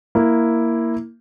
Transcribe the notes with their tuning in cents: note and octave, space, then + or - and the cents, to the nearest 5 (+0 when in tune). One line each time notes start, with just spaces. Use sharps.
A#3 +0 E4 +0